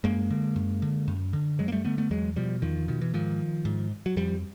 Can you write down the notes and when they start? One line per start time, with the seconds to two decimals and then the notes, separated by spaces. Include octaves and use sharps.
0.04 F#2 G#3 A#3
0.31 D3
0.56 F#2
0.82 D3
1.08 F#2
1.33 D3
1.59 F#2 F#3 G#3
1.68 A#3
1.72 G3 A3
1.85 D3 A3 B3
1.98 A3 B3
2.11 E2 F#3 G#3
2.36 B2 F3 G3
2.62 E2 D#3 F3
2.88 B2 D#3
3.01 E3
3.14 G#2 D#3 F3
3.65 G#2
4.06 F#3
4.17 F2 F3 G3